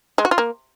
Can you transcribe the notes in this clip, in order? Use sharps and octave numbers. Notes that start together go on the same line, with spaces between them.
G#3
F#4
F4
A#3